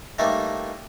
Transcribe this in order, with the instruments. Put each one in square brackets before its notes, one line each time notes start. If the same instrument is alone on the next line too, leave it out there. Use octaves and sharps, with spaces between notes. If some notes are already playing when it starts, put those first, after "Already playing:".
[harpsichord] E3 G3 A3 A#3 D#4